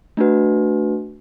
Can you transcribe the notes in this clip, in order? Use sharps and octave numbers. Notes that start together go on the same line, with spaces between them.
A3 D4 F#4 B4